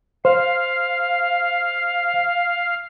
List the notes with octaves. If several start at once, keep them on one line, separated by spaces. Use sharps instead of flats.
C5 F5